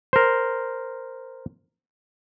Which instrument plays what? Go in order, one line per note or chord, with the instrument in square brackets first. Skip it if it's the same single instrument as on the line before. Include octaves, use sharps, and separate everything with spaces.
[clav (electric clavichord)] A#4 C5